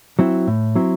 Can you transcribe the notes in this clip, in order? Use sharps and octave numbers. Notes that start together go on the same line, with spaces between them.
F#3 C4 E4
A2
F#3 C4 E4